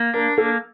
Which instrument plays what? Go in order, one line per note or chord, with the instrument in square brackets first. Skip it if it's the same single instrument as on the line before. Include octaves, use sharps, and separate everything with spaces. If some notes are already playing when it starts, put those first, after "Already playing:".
Already playing: [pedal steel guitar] A#3
[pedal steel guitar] D4 [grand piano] A#4
[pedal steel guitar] A#3 [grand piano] A4